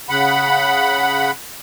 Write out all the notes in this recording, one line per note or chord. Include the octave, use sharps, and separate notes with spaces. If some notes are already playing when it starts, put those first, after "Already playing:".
C#3 F#5 B5